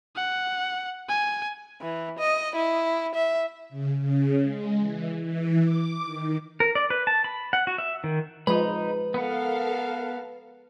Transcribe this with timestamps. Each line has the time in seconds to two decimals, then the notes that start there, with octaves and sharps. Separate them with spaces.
0.16 F#5
1.09 G#5
1.81 E3
2.19 D#5
2.55 E4
3.15 E5
3.69 C#3
4.01 C#3
4.43 G#3
4.79 E3
5.24 E3
5.61 D6
6.03 D#3
6.60 A#4
6.75 D5
6.90 B4
7.07 A5
7.24 B5
7.53 F#5
7.67 F#4
7.78 E5
8.04 D#3
8.47 F3 G#3 D#4 B4 B5
9.14 B3 A4 A#4 F5 F#5